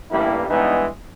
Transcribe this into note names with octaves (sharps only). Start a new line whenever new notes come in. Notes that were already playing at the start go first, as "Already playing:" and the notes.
A1 G2 E3 G3 A#3 E4
G2 E3 G#3 B3 D#4